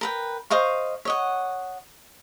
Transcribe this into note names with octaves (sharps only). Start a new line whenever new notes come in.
A#4 B4 G5
C5 D#5 F5 C#6
C#5 D#5 F#5